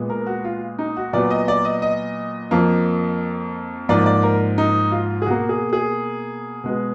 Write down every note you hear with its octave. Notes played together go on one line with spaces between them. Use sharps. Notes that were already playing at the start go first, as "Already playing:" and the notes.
Already playing: A#2 G#3 B3
A#4
F#4
F4
D#4
F#4
A#2 F#3 B3 D5
D#5
D5
D#5
D#5
F2 F3 A#3
G#2 F3 A#3 D5
D5
A#4
D#4
F4
G#4
B2 A#3 F#4
G#4
G#4
B2 G#3 B3